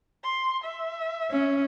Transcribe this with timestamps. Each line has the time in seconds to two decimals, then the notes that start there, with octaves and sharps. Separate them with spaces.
0.23 C6
0.64 E5
1.31 C#4